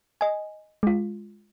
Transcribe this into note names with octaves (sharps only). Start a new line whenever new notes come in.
D#5 G#5
G#3 F4